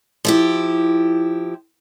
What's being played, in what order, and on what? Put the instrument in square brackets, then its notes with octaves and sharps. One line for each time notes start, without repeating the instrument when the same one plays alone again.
[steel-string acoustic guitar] F3 E4 G4